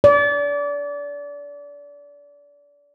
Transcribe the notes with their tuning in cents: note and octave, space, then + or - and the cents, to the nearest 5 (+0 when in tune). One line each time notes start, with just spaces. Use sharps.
D5 -30